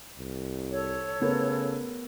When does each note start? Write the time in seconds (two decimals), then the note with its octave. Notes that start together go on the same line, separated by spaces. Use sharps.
0.19 C2
0.71 A4 C#5
1.21 C#3 A3 B3 A#4